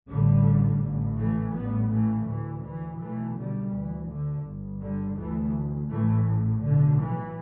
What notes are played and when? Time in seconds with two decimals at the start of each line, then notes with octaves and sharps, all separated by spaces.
0.08 A1 A2 D3 G3
0.81 A1 A2
1.18 E3 A3
1.54 A1 A2 G3 B3
1.91 E3 A3
2.26 D2 E3
2.63 E3
2.99 B1 B2 E3 A3
3.36 D3 G3
3.72 D2 E3
4.09 D3
4.45 G1 G2
4.81 D3 G3
5.17 D2 E3 A3
5.89 A1 A2 E3 A3
6.62 B1 A2 D3
6.99 E3